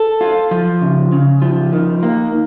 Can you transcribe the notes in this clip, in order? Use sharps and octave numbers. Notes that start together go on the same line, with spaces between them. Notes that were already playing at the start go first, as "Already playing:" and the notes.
Already playing: A4
F4
F3
C#3
C#3
F3
D#3
A#3